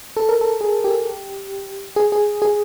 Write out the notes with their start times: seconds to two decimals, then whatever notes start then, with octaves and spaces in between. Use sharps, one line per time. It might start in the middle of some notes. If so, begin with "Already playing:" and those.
0.17 A4
0.29 A#4
0.41 A4
0.61 G#4
0.84 G4
1.96 G#4
2.12 G#4
2.42 G#4